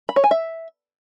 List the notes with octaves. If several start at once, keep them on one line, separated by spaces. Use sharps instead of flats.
B5
C#5
G#5
E5